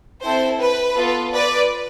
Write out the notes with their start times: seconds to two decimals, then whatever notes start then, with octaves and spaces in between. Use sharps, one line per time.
0.22 C4 E4 A4 C5
0.59 B4
0.96 B3 F4 A4
1.32 B4 D5